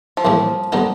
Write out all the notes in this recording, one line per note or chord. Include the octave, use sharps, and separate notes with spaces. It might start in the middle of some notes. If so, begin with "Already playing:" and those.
F3
A#1 A2 E3 G3 C4
D3 G3 B3 D#4